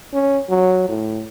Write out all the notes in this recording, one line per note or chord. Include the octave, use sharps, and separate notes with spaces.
C#4
F#3
A2